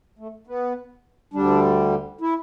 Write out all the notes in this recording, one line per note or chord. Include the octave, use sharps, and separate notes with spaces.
A3
B3
D2 D3 G3 D4
E4